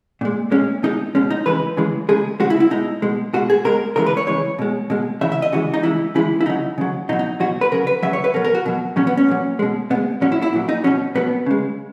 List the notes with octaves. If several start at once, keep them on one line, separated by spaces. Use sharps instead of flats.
A#2 G#3
A#2 G#3 C#4
B2 G#3 D#4
B2 G#3 C#4
D#4
C#3 E3 G#3 B4
C#3 E3 G#3
C#3 G#3 G#4
C#3 G#3 F#4
E4
E4
B2 G#3 D#4
B2 G#3
B2 G#3 F#4
G#4
B2 G#3 A#4
C#3 E3 G#3 A#4
B4
C#5
C#3 E3 G#3 C#5
B2 G#3
B2 G#3
C#3 E3 G#3 E5
E5
D#5
C#3 E3 G#3 F#4
D#4
C#3 E3 G#3 E4
C#3 E3 G#3 E4
E4
C#3 F#3 D#4
C#3 F#3
B2 F#3 D#4
D#4
B2 F#3 F#4
B4
C#3 F#3 A#4
B4
C#3 F#3 E5
C#5
B4
B2 F#3 A#4
A#4
F#4
B2 F#3
A#2 F#3 C#4
B3
C#4
A#2 F#3
B2 G#3
B2 G#3 B3
A#2 F#3 C#4
E4
E4
A#2 F#3
D#4
B2 F#3 C#4
B2 F#3 B3
C#3 G#3